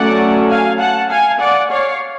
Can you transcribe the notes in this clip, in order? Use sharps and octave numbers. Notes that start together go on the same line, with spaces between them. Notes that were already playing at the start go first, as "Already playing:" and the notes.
Already playing: F#3 A3 C#4 D5 F#5
F5 G#5
F#5 A5
F5 G#5
D5 F#5
C#5 F5